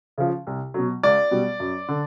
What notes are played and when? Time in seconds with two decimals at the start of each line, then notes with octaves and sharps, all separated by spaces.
0.18 C#3 F3
0.47 C2
0.74 B2 F#3
1.03 C#2 D5
1.31 B2 G3
1.60 F#2
1.88 D3